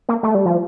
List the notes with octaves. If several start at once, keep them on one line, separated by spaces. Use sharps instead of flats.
A#3
A3
G3
F3